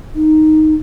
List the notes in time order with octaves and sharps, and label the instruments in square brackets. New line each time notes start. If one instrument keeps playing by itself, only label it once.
[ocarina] D#4